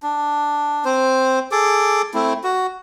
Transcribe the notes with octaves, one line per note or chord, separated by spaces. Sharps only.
D4
C4 C5
G#4 A4 D6
A3 C4 E4
F#4